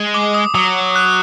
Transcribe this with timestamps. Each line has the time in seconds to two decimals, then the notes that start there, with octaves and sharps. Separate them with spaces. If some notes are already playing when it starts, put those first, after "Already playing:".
Already playing: G#3
0.14 D6
0.34 D#6
0.55 F#3 D#6
0.96 F#6